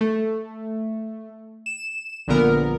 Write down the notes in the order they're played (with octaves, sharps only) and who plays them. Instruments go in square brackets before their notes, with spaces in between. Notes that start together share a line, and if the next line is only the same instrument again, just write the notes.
[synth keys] A3
E7
A#1 A#2 D3 B3 A#4